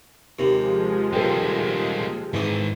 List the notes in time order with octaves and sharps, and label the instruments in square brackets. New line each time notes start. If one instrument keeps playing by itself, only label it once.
[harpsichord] D#2 C3 [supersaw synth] F3 G#3
[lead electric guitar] G3 A#3 [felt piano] A4 G5
[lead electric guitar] G#2 D#3 [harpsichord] E3 D#6